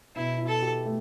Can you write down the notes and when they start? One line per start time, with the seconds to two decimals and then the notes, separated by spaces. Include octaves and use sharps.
0.16 B2 E4
0.38 E4
0.47 A4
0.62 G4
0.85 A3